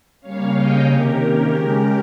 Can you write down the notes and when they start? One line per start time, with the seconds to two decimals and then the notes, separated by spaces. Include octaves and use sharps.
0.20 C#3 G3 A#3 C#4 C#5 F5
0.53 D#5 G5
0.85 C3 D#3 A#3 C#4 G4 A#4
1.51 C#3 G#3 C#4